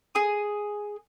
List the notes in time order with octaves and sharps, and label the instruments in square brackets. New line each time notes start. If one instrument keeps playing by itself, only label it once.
[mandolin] G#4 D#6